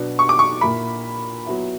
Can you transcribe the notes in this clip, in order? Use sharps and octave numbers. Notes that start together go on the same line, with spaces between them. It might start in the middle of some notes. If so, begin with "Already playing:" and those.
Already playing: B2 F#3 B3 D4
C#6
D6
C#6
A#2 A#3 E4 B5
F#3 B3 E4